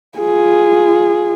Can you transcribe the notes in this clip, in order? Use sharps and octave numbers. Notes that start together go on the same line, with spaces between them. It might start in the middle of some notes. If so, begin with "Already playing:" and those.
F4 G#4